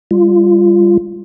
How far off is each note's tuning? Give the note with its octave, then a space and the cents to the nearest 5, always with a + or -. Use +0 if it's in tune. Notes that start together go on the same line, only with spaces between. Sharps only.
G3 +25 F4 -15